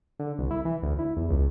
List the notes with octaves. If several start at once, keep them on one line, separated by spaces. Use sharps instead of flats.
D3
C2
E4
E3
D2
E4
E2
C#2